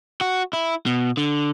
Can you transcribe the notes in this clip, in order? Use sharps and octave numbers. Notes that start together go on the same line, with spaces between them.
F#4
E4
B2
D3